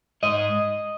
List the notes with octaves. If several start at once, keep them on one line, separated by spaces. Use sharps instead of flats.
G#2 D#5